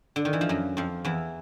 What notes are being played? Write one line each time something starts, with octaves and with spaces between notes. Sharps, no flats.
D3
D#3
E3
F3
F#2 F#3
F2 F3
E2 E3